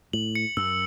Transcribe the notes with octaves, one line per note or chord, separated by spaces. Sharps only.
A2 F#7
C#7
F#2 E6